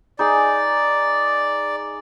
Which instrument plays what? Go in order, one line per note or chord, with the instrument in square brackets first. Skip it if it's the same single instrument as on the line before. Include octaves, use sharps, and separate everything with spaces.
[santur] D#4 G#4 [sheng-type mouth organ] D5